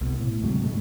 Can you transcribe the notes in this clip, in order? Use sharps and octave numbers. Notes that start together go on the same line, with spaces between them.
C2 B2
A2
D2 G#2 C3 F#3
G#2 B2 G3 A3